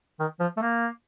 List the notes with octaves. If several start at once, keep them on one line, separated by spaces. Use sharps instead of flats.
D#3
F3
A3
A#3